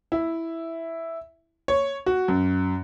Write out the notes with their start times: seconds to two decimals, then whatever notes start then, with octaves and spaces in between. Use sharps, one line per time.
0.12 E4
1.68 C#5
2.06 F#4
2.28 F#2